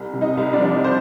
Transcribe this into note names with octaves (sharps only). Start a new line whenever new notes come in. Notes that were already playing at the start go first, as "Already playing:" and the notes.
Already playing: C2
C3
D#4 D#5
C2
D4 D5
F3
C5